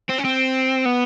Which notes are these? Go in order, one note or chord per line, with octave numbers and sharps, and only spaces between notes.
C4
C#4
C4
B3